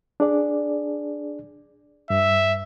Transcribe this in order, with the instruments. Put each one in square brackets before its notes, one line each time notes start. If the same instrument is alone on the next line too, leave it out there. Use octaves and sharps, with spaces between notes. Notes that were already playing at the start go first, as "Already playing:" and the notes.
[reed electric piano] D4 G#4 D5
[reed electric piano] G2 [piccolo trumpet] E5